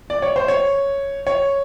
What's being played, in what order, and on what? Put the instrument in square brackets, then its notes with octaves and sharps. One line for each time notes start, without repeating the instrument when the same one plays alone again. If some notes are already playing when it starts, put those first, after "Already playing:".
[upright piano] D5
C#5
C5
C#5
C#5